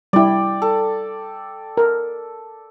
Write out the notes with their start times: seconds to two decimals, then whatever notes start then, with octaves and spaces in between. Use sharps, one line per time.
0.13 G3 E4 D5 G5
0.62 A4
1.77 A#4